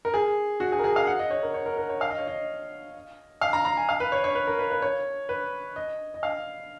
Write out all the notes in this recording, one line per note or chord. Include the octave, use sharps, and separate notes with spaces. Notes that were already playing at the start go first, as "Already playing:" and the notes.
A#4
G#4
F#4
G#4
A#4
G#4
F5
F#5
D#5
C#5
A#4
C#5
A#4
A#4
C#5
F5
D#5
C#5
D#5
F5
A#5
A#5
G#5
F5
B4
C#5
C#5
B4
A#4
B4
B4
C#5
B4
D#5
D#5
F5